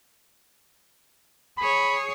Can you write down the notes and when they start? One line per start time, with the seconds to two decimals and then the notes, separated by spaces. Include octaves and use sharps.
1.58 G#4 C#5 B5